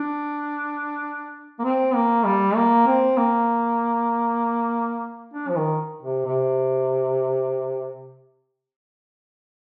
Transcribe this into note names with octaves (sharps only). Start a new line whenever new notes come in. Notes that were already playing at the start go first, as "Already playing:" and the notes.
Already playing: D4
A#3
C4
A#3
G3
A#3
C4
A#3
D4
F3
D#3
C3
C3